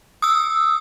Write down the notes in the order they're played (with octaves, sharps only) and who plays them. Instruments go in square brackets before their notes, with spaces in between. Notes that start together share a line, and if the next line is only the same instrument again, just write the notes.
[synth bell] D#6 E6